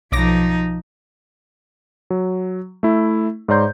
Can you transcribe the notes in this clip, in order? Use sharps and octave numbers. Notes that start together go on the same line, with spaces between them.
B1 F3 D#4 D6 A#6
F#3
A3 E4
G#2 C#5 D5 A#5 C6 G6